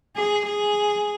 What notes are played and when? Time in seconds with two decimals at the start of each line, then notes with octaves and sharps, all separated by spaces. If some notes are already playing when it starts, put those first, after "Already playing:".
0.17 G#4
0.46 G#4